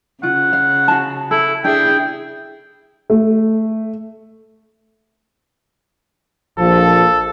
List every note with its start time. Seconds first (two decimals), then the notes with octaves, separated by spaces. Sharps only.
0.23 C#3 F4 F#5
0.53 F5
0.88 F#4 A5
1.31 E4 A4
1.64 D4 E4 G4 G#4 G5
3.10 A3
6.59 A#1 F3 A4